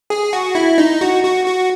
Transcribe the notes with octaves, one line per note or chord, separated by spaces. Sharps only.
G#4
F#4
E4
D#4
F#4
F#4
F#4